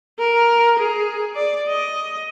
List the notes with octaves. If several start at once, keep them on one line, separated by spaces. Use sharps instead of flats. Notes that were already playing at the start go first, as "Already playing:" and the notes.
A#4
G#4
D5
D#5